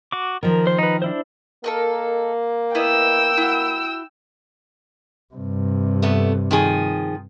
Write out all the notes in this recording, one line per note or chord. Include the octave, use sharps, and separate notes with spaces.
F#4 D6
D#3 F3 A#4
C5
D#4 B4
D4 E4 C5
A#3 A4 A#4 D#5
B3 E4 D#5 G5 E6
E4 F#4
G2 C3
A3 B3
D#3 F3 G#4